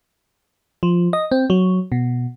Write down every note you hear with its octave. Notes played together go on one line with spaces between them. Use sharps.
F3
D#5
C4
F#3
B2